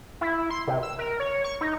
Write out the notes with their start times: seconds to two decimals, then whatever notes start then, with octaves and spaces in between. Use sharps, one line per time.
0.21 E4
0.50 C6
0.67 C3
0.83 E6
0.99 A#4
1.20 C#5
1.44 C#6
1.61 D#4